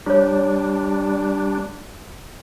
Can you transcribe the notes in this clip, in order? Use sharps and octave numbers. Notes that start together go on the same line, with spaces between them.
G3 D4 F4 C#5